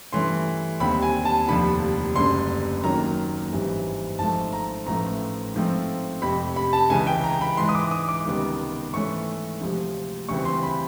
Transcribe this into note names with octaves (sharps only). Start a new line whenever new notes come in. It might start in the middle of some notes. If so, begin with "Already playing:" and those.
G2 E3 A3 C#4 C6
D#2 D3 G3 C4 B5
G#5
A5
F1 D#2 D3 F3 B5
F#1 F#2 D3 G3 C6
F#2 D#3 F#3 A#3 C#4 A#5
G#1 G2 E3 G3
G#1 G#2 F3 A3 A5
A#5
A1 A2 F3 A3 A#5
G#2 F3 A3 C4
F1 F2 C3 B5
B5
A5
C#2 C#3 E3 G#5
G5
A#5
B5
G#2 E3 G#3 C6
D#6
D6
D#6
D6
C#2 C3 D#3 G3 B3
G#2 E3 A3 C#4 C#6
D2 C3 F3 G#3
D2 C#3 E3 G3 C4 C#6
C6
B5